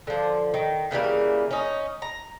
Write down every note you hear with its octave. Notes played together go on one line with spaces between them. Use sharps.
D3 F3
D#3
C#3 E3 G3 A#3
C#4 D#4
A#5